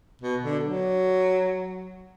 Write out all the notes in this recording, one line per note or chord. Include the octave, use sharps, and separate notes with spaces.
B2
D3
F#3